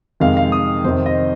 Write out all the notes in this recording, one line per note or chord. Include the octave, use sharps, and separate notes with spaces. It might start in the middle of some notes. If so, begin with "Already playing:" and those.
F2 C3 D#3 G#3 F5
F5
D#6
F2 C3 D#3 C4 C5
D#5